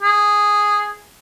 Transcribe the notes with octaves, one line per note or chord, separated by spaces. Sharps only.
G#4